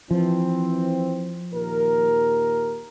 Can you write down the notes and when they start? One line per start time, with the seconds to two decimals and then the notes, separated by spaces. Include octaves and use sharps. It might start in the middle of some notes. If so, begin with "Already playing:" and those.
0.11 E3 F3 C4
1.53 D#2 A#2 A#4